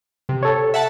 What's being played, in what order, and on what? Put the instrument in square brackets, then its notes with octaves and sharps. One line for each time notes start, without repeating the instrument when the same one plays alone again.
[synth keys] C3
[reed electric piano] A4 C#5
[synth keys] E5 F#5 A5